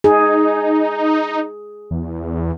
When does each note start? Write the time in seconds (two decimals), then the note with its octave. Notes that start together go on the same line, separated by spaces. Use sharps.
0.04 D#4 G#4
1.91 E2